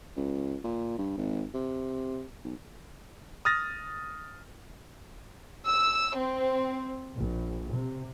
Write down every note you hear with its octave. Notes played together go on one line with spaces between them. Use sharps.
C#2
A#2
G2
G#1
C3
B1
D#6 F6 A6 A#6
E6
C4
A#1
C3